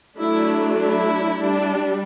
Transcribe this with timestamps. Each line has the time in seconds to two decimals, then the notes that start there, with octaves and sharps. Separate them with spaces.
0.18 F#3 A3 D4 E4
0.78 E4
1.39 G3 D4